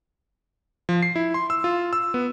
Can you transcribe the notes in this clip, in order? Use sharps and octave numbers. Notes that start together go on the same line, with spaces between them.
F3
C7
E4
C6
E6
F4
E6
B3